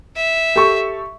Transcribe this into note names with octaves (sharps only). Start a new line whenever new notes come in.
E5
G4 A4 C#6